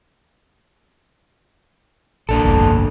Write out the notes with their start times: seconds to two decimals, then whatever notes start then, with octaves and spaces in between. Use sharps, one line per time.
2.29 A#1 A#3 D4 A4
2.43 G1 C2 F2